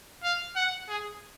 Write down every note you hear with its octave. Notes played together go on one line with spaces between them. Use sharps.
F5
F#5
G#4